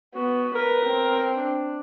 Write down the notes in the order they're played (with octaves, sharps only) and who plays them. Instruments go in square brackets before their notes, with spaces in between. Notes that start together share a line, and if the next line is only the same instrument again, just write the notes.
[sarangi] B3 [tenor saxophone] F#4
[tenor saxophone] A#4 [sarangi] B4
[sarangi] C4
[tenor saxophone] D4